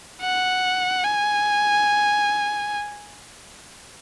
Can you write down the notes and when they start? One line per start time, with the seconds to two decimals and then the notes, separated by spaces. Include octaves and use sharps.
0.21 F#5
1.04 G#5